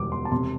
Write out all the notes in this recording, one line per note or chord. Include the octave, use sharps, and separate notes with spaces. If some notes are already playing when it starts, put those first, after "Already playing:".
Already playing: E1 D2 G3 D6
C6
A5
C3 C6